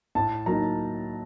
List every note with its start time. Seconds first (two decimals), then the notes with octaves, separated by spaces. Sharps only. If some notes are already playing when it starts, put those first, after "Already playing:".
0.15 A2 A5
0.46 F#3 A#3 D#4 A#5